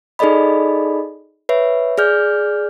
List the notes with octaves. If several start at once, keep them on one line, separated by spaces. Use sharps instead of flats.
D#4 G#4 A4 D5 D#5 B5
B4 C#5 E5
G#4 D5 F6 G6